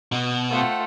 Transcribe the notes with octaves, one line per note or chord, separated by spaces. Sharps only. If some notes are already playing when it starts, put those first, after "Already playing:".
B2
A3 F4 C5 F#5 G5